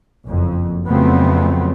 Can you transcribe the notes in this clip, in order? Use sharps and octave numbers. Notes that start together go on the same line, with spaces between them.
F#1 F2
F2 C#3 F#3 A3 B3 C4